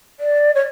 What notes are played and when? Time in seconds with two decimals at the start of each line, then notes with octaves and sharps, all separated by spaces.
0.19 D5
0.54 C#5